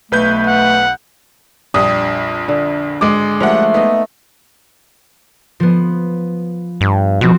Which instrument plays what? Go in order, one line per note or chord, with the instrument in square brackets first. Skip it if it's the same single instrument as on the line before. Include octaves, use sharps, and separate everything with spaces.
[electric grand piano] B1 B4 G6 [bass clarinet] A3
[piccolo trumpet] F#5
[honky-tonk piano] A#1 F2 [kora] G3 D4 [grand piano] D#6
[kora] D3
[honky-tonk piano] G#1 [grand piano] G#3 D6
[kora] F3 A#3 [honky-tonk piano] G3 F#5 [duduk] A3
[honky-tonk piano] B3 [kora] D#4 D#5
[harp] F3 B3
[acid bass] G2
[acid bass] B2 [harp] F3 C4 F#4